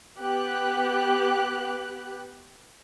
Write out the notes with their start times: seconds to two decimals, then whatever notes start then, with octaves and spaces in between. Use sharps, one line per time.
0.19 B3 G4 F#6